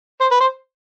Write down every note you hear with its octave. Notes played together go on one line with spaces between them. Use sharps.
C5
B4
C5